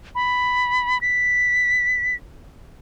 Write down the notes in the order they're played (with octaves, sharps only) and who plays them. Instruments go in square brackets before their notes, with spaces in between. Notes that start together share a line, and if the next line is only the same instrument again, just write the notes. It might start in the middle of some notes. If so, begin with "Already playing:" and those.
[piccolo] B5
B6